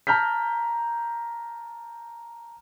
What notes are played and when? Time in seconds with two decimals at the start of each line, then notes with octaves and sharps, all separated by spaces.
0.07 A5 A#5 F6 G6 B6